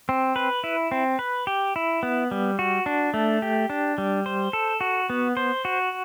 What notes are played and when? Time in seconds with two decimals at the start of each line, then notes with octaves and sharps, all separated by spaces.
0.09 C4
0.36 B4
0.64 E4
0.92 C4
1.19 B4
1.47 G4
1.76 E4
2.03 B3
2.31 G3
2.59 F#4
2.86 D4
3.14 A3
3.42 G4
3.70 D4
3.98 G3
4.26 C5
4.53 A4
4.81 F#4
5.10 B3
5.37 C5
5.65 F#4